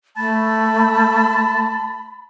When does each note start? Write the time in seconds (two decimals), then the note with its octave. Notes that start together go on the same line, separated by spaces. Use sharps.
0.17 A3 A5 B5